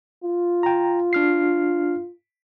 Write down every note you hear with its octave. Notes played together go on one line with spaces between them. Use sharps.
F4
G5 A#5
D4 F6 C7